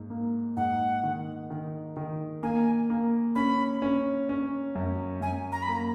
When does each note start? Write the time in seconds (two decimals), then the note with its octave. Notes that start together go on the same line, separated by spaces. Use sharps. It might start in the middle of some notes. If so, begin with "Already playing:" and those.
Already playing: G#2 A#3
0.10 A#3
0.57 G#2 F#5
1.03 D#3
1.50 D#3
1.97 D#3
2.43 A#3 G#5
2.90 A#3
3.35 C#4 B5
3.82 C#4
4.29 C#4
4.75 F#2
5.21 F#2 G#5
5.52 A#5
5.62 B5
5.69 A#3 A#5